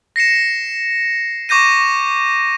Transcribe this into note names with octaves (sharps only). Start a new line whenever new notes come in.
A#6 C7 C#7 E7
C#6 D6 G6 A#6 D#7